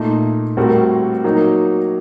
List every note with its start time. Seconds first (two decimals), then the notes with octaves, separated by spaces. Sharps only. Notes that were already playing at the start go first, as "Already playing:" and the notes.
Already playing: A#2 A3 D#4
0.57 A2 G3 C4 F#4 A#4
1.24 F#3 A#3 D#4